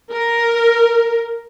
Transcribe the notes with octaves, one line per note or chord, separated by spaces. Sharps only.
A#4